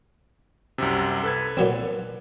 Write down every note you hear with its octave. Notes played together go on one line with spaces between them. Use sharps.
C2 F#2 C3
A4 B4 G#6
A#2 F#3 C4